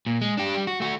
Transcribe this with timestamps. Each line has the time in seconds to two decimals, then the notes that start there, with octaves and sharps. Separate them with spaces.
0.06 A#2
0.21 G#3
0.37 D4 G4
0.55 G3
0.67 F#4
0.80 A3 F#4